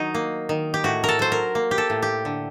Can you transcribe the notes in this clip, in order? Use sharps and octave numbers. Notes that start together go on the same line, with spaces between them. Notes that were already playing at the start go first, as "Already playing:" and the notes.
Already playing: D#3 F#3 D#4
A#3
D#3
G4
A2 F#4
A4 A#4
F#3 C5
A#4
A#3
G4
A4
A2
G4
D3